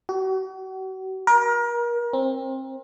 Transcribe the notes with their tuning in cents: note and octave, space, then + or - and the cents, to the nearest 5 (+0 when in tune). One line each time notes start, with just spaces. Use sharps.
F#4 +40
A#4 +30
C4 +25